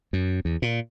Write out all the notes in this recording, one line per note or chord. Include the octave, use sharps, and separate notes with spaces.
F#2
E2
A#2